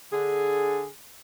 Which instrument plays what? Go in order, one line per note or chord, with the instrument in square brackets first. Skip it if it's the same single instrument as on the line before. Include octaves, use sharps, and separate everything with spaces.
[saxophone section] D3 G#4